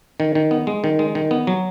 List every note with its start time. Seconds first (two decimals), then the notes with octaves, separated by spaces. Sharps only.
0.20 D#3
0.35 D#3
0.51 B3
0.67 G#3
0.84 D#3
0.99 G#3
1.15 D#3
1.31 B3
1.47 F#3